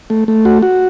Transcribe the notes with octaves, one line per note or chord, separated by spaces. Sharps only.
A3
A3
F#4
F#4